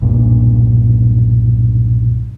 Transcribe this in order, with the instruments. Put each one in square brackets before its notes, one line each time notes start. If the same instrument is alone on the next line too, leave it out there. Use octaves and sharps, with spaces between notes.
[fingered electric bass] B1 G2 A#2